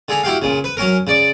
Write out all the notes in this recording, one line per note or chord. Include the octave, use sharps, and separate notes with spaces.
D3 G#4 A#5
E4 F#4 G4 F5
A#2 C#3
B4
F#3 C#4 A#4
C#3 D5 D6